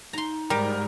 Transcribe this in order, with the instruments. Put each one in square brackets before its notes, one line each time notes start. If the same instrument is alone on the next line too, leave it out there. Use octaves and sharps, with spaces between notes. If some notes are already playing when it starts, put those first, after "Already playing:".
[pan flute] D#4 [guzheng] A#5 C6
[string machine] G#2 [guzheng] G3 [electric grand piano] A#4 G5 A#5